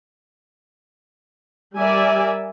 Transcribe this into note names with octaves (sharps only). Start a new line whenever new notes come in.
G3 A#4 D5 E5 G#5